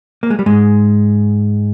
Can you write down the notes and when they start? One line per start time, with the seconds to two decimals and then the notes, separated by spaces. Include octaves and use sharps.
0.23 A#3
0.30 G#3
0.39 G3
0.46 G#2 G#3